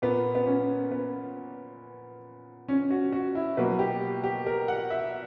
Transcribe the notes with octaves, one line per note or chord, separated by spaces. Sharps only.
A#2 A#3 B3
B3
C#4
B3
C#4
F#4
F#4
E4
B2 F#3 A#3 B4
G4
G4
A#4
F#5
E5